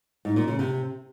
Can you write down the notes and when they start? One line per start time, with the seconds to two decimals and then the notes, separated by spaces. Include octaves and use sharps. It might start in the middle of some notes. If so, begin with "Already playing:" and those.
0.25 G#2
0.36 A#2
0.48 C#3
0.59 C3